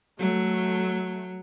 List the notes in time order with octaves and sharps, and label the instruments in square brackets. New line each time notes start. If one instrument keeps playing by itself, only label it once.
[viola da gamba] F#3 [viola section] A3